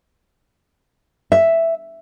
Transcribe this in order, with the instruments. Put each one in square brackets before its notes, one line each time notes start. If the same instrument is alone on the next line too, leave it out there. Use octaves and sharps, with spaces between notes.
[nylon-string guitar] E5